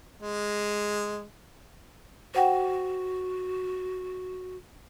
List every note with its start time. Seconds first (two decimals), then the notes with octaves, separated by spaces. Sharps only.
0.22 G#3
2.35 F#4 C5 F#5 G5